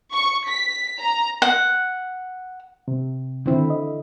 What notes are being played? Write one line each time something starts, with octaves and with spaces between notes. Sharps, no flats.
C#6
B6
A#5
F#5
C3
D3 D#3 C4 E4
D#5